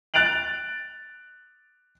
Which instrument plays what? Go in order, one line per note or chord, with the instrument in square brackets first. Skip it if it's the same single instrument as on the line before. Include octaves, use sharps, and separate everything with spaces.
[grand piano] F#6 A6 D7 F7 F#7